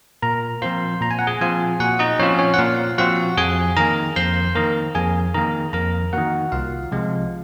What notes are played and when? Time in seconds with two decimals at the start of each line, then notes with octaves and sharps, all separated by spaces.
0.22 A#2 A#4 A#5
0.62 F3 C4 F4 C5 C6
1.01 A#2 A#5
1.11 G#5
1.19 F#5
1.27 G#4 G#5
1.41 F3 C4 F4 G#4 G#5
1.80 A#2 F#4 F#5
1.99 D#4 D#5
2.19 F3 C4 C#4 F4 C#5
2.39 C#4 C#5
2.54 F#5
2.59 A#2 F4 F5
2.98 F3 C4 F4 F#4 F#5
3.37 F2 G#4 G#5
3.77 D#3 A#3 A#4 A#5
4.16 F2 C5 C6
4.55 D#3 A#3 A#4 A#5
4.95 F2 G#4 G#5
5.34 D#3 A#3 A#4 A#5
5.73 F2 A#4 A#5
6.13 D#3 A#3 F#4 F#5
6.52 C2 F4 F5
6.92 C3 F3 G#3 C4